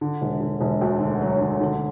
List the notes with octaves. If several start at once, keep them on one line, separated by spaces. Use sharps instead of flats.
D3
E1
D3
E1
D2
D3
F#3
D3
D3